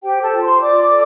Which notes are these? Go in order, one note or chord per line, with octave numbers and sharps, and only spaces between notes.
G4 C5 G5
A4 A5
F4
C5 C6
F4 D5 D6
A4